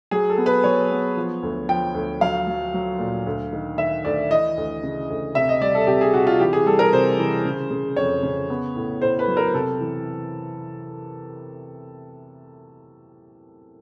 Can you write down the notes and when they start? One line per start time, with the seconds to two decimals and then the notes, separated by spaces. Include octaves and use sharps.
0.11 F#3 G#4
0.30 A4
0.38 B3
0.46 B4
0.64 F#3 C#5
0.91 B3
1.17 F3
1.43 D2
1.69 F3 G5
1.94 D2
2.21 F#3 F5
2.47 F#3
2.74 F#3
2.99 A#2
3.26 D2
3.53 D#3
3.78 D#3 E5
4.05 D2 D5
4.30 E3 D#5
4.57 D2
4.83 C#3
5.10 D2
5.35 C3 E5
5.49 D#5
5.61 G3 D5
5.75 A4
5.87 C3 G4
6.01 G#4
6.14 C3 F#4
6.27 F4
6.40 E3 G4
6.53 G#4
6.66 G3 A4
6.79 A#4
6.93 C3 C5
7.19 E3
7.45 C#3
7.71 C#3
7.96 F2 C#5
8.23 C#3
8.50 B3
8.76 A2
9.02 A2 C5
9.19 B4
9.28 F#3
9.37 A#4
9.54 C3 A4
9.80 E3